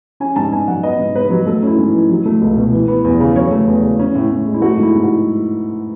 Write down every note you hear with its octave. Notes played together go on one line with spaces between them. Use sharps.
C#4 G#5
G#2 A5
G#2 G#5
F#3 F#5
B3 D#5
G#2
G#2 B4
F#3
A3 A4
C#4 E4
G#2
E3
F#3
A3
C#2
B2
E3
B3
E2
C#3
F#3 C#5
A3
E2
C#3
C#4
A2
A2
G#3
E4
A3 F#4
G#2
E4
G#2
F#4